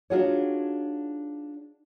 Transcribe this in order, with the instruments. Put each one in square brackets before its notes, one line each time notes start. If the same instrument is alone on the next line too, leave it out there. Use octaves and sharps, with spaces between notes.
[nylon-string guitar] D4 D#4 F4 F#4 G#4 C#5